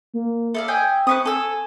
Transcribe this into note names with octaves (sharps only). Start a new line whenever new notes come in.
A#3
A4 D5 E5 F5
D#5 G5 G#5
C4 B4 C#6 D#6
A4 G#5 E6